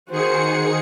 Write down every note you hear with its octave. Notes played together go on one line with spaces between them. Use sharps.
D#3 F#4 G#4 C5 C#7